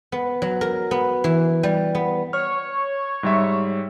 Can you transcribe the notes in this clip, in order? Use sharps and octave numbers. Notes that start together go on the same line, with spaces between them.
B3
F#3
A#4
B3
E3
G3
B3
C#5 F6
G#2 G3 E5